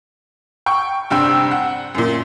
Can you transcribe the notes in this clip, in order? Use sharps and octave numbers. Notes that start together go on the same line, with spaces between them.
G5 C#6
F1 G2 C4 G5 E6
F#5
F#2 A#2